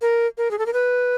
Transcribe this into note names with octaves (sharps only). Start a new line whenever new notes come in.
A#4
A#4
G#4
A4
A#4
B4